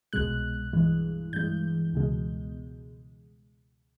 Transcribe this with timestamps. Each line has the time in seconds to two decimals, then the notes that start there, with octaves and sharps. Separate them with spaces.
0.13 C2 B2 G#3 F#6
0.73 G2 E3 G#3
1.33 G2 E3 G#3 G6
1.93 C#2 B2 G#3